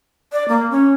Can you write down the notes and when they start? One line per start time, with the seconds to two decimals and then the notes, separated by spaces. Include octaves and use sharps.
0.32 D5
0.49 A#3
0.71 C#4